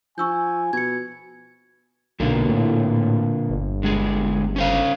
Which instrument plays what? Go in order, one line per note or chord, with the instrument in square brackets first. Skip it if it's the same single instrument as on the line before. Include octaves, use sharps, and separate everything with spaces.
[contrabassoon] F3 [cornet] G#5 [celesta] C#6 E6 G6
[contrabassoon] B2 [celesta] G#6 C#7
[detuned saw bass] B1 [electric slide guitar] A#2 D3 A#3
[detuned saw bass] A2
G1
[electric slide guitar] D3 G#3 G#4
C#4 C5 F5